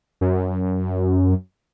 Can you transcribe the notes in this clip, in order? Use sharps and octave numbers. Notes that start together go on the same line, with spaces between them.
F#2